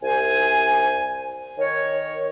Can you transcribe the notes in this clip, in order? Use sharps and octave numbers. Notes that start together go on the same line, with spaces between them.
C2 C5 G#5
D#3 A#4 C#5